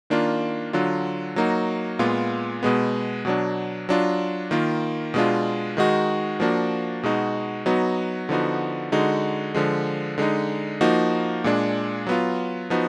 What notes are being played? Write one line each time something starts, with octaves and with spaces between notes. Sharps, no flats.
D#3 A#3 D4 F4
D3 F#3 D4 F4
F#3 A#3 D#4 F#4
A#2 G#3 B3 F4
B2 G#3 B3
B2 F#3 D4
F#3 D4 F4
D#3 A#3 F4
B2 G#3 D4 F4
D#3 G#3 D#4 F#4
F3 A#3 D4 F#4
B2 G#3 D#4 F#4
F#3 B3 D#4 F#4
D3 F3 B3 D#4 F#4
D3 G#3 D#4 F#4
D3 F3 G#3
D3 G#3 D#4
F3 A#3 D#4 F#4
A#2 G#3 D4
F#3 B3 F4
F3 B3 D#4 F#4